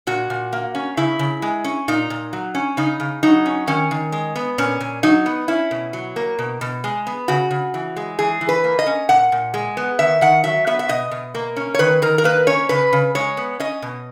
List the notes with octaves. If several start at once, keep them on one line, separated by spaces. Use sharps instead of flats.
A#2 F#4
A#2
A#3
C#4
C#3 E4
C#3
G#3
C#4
A#2 D#4
A#2
F#3
C#4
C#3 D#4
C#3
F#3 D#4
C#4
D#3 C#4
D#3
G#3
B3
A#2 C#4
A#2
F#3 D#4
B3
C#4 E4
B2
F#3
A#3
B2
B2
G#3
B3
C#3 F#4
C#3
E3
G#3
E3 G#4
E3
B4
A#3
D#5
C#4
A#2 F#5
A#2
G#3
B3
D#3 E5
D#3 F#5
F#3 E5
B3 E5
E5
B2 D#5
B2
A#3
C#4
C#5
D#3 B4
D#3 A#4
A#4
A#3 B4
C#4 C#5
C#3 B4
C#3
G#3 C#5
B3
C#4 D#5
B2